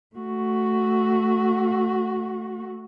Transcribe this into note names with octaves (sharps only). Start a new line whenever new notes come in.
A3 F#4